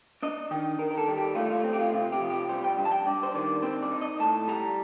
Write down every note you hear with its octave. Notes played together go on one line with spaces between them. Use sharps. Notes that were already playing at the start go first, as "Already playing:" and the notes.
D4 D#5
D#3 G5
D#3 A#4
A#4
A4
G3
G4
A3 F4
F4
C4
G4
F4
C3 F4
G4
F3
G4
G3 C5
G5
G2
A5
G5
G2 D5
C5
D#3 D5
C4 C5
D5
D#4
D#5
A2 A5
G3 A#5